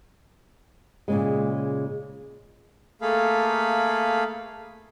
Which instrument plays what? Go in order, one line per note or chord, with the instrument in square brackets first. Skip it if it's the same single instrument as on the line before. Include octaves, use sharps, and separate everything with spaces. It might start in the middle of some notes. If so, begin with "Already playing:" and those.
[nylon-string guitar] A#2 C#3 G#3
[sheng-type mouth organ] A3 A#3 G#4 A4 F5 B5